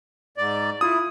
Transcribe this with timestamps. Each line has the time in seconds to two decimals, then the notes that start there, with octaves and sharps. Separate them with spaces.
0.37 G#2 D5
0.81 E4 F4 D#6